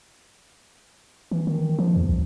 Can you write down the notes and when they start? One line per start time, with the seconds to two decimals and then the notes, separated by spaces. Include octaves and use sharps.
1.31 E3
1.47 D#3
1.79 F3
1.96 E2
2.09 C2